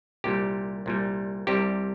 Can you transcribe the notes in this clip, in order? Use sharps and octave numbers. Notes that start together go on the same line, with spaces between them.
C2 A#2 G3 G4
C2 A#2 G3
C2 C3 G3 G4